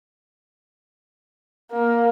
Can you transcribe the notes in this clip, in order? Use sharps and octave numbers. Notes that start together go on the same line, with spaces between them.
A#3